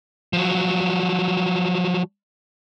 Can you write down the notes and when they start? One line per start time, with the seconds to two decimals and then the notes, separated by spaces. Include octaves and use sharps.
0.33 F3 F#3